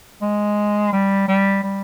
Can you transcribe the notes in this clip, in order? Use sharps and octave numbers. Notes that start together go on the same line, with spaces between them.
G#3
G3
G3
G3